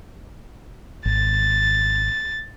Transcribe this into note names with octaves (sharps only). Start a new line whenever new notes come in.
G#1 A6